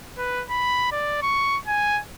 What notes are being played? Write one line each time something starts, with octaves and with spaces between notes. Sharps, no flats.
B4
B5
D5
C#6
G#5